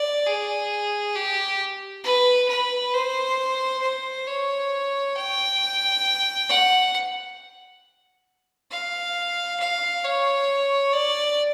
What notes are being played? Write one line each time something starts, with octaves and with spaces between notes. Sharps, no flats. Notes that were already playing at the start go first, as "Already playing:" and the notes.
Already playing: D5
G#4
G4
B4
B4
C5
C5
C#5
G5
F#5
F5
F5
C#5
D5